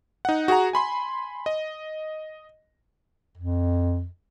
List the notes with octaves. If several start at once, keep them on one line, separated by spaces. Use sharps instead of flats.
D#4 F#5
F#4 G#4 F#5 A#5
G#5 B5 C6
D#5
F2